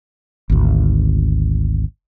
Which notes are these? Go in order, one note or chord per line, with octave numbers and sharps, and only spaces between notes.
G#1 D2